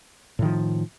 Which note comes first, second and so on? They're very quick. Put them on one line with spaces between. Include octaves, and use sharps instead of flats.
A2 D#3 F3